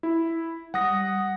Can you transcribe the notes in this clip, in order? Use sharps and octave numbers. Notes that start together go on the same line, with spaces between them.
E4
G3 F#5 D#6 A#6